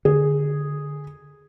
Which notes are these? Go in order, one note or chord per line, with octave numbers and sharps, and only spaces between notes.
D3 G#4